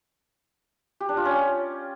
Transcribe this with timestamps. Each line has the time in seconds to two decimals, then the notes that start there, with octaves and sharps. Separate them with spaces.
1.01 G4
1.09 D4
1.17 F4
1.25 C#4